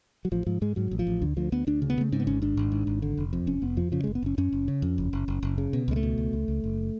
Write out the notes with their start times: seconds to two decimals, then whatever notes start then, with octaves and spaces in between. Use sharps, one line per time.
0.25 F#3
0.32 A1 F3
0.47 G#2 F3
0.62 G#2 G#3
0.76 G#2 F#3
0.91 A1
0.99 F3
1.07 A1
1.22 D2 D3
1.37 D2 F3
1.52 D2 B3
1.67 D2 D4
1.82 C#3
1.90 B3
1.98 C#3 A3
2.12 G#2 C#4
2.20 B3
2.27 G#1 C#4
2.42 G#2 D4
2.57 G#1
2.72 G#2
2.87 G#1
3.02 D3
3.17 F1
3.33 F2
3.47 F1 C#4
3.62 F1 B3
3.77 F2 F3
3.92 C#3 F3
4.04 F#1 G#3
4.15 B3
4.23 F#1 C#4
4.38 F#2 C#4
4.52 F#1
4.68 C#3
4.82 F2
4.98 F#1
5.13 F#1
5.28 F#1
5.43 F#1
5.58 C#3
5.73 B2
5.88 C#2 G#3
5.96 A3
6.03 B2
6.18 C#2
6.33 C#2
6.48 C#2
6.64 F#1